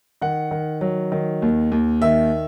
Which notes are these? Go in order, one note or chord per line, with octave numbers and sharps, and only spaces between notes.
D#3 F#5
D#3
F#3
D#3
D#2
D#2
D#3 E5